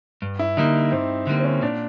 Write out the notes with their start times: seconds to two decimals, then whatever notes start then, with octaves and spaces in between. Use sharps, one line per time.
0.22 G2
0.39 E4
0.57 D3 G3 A#3 D#4
0.91 G2 C4
1.27 D3 G3 A#3
1.39 C4
1.44 C#4
1.62 A#2 D4